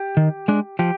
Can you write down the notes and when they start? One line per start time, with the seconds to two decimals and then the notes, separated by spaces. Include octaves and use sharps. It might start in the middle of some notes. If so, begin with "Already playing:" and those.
Already playing: G4
0.17 D#3
0.48 G#3 D4
0.79 F3 G4